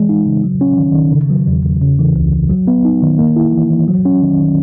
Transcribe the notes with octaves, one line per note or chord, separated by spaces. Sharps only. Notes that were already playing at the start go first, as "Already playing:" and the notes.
Already playing: E3 G#3
D#4
C#3
F#3
C#4
D#3
D#3
C#3
F#3
E2
E2
C#3
E3
C#2
C#2
F#3
B3
D#4
D#3
A#3
E4
E3
E3
F#3
C#4
D#3
D#3